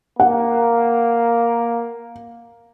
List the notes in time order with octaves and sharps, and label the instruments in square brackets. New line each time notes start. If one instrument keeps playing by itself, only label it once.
[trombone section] A#3 [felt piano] F#5